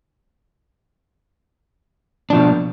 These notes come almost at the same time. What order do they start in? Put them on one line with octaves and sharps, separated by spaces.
D4 F3 B2